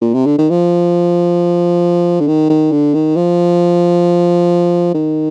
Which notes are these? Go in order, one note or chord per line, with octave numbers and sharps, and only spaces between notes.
A#2
C3
D3
D#3
F3
D3
D#3
D#3
D3
D#3
F3
D#3